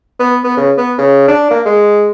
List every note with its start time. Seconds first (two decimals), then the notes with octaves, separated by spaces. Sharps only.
0.20 B3
0.44 B3
0.57 C#3
0.77 B3
0.98 C#3
1.28 D4
1.50 A#3
1.65 G#3